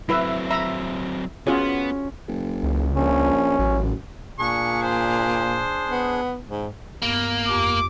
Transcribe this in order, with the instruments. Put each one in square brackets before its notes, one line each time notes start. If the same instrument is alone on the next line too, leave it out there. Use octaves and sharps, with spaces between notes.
[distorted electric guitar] F#3 C4 [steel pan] E4 B4 E5
[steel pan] E5 A#5 B5
[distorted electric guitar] B3 [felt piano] C#4 [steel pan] F4 F#4 G#4
[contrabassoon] F#1
[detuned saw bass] C#2
[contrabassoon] A#1 [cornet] C#4
[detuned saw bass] A1 [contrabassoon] F#2
[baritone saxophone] A#2 [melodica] D4 G#4 [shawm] C#6
[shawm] C5
[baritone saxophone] B3
G#2
[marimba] G2 B3 [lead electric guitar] A#3
[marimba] F2 G4 A#5 [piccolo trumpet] D6